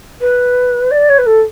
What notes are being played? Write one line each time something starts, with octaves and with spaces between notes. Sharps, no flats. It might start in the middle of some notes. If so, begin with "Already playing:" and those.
B4
D5
C#5
B4
A4